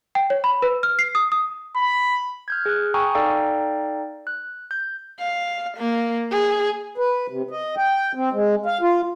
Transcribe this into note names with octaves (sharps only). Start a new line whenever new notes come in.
G5
C#5
B5
B4
F6
C7
D#6
D#6
B5
F6 G6 G#6
G#4 F#6
G5 G#5 A#5 C#6 D#6 E6
D#4 A4 D5 F5 G5 A#5
F#6
G6
F5
A#3
G#4
B4
C3
D#5
G5
C4
G#3
F5
F4